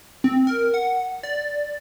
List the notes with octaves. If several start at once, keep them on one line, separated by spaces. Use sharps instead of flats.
C4
A#4
F#5
D5